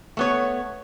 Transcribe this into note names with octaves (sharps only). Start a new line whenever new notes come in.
A3 B3 C#5